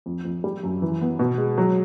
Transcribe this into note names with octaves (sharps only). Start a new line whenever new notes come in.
F2
F2
G3
F#2
E3
B3
B2
G#3
F#3